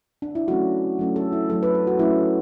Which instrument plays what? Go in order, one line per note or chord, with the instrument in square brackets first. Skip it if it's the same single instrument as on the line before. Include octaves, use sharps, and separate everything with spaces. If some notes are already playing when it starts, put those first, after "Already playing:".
[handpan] D4
E4
F#3 A3 C#4 F#4
F#3 A3 C#4
A4
E4
F#3 A3 C#4 A4
B4
A4
F#4
F#3 A3 C#4 E4